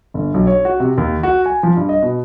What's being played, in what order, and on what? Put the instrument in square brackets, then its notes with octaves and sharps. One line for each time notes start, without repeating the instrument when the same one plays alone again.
[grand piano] G1
B1
C#5
F#4
C3
D#2
F#4
G#5
F3
G2
D#5
B2